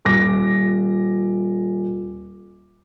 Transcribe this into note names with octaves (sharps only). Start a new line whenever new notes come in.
D#1 D6 A#6